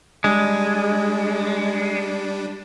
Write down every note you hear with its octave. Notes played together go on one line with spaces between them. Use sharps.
G3 G#3 D4